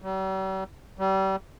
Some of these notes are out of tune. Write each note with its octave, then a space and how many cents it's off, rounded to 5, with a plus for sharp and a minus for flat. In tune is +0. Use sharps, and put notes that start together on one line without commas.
G3 -45
G3 -30